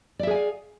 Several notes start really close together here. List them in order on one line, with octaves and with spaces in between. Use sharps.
D5 E5 G#4 G#5 F5